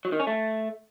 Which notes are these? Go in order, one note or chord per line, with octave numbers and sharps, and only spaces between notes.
F#3
D#3
C#4
A3